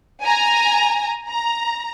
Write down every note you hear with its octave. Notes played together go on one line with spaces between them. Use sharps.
G#5 A#5
A#5